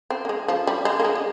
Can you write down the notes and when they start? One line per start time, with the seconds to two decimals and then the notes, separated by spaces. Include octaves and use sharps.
0.10 C4
0.25 A#3
0.29 G#3
0.48 F3
0.67 G3
0.85 G#3
1.00 A#3
1.04 G#3
1.16 G#3